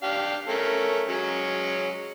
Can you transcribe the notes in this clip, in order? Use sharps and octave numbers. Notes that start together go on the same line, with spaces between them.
D4 G4 F5
A3 C#4 A#4
F#3 G#3 C#4